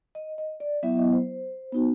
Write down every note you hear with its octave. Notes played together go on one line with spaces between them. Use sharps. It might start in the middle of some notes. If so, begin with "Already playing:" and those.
D#5
D#5
D5
F#3 B3 E4 E5
D#5
C5
B3 D#4 F#4